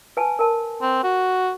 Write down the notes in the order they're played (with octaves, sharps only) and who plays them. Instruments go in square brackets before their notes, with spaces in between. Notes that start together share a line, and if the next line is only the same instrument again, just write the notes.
[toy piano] B4 G#5 A5
A#4 A5
[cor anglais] C4
F#4